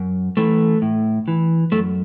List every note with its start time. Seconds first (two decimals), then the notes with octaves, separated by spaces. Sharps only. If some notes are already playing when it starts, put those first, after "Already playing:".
Already playing: F#2
0.37 E3 A3
0.82 A2
1.28 E3
1.72 F#2 A3